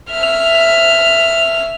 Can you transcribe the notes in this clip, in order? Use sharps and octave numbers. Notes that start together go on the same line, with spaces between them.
E5 F6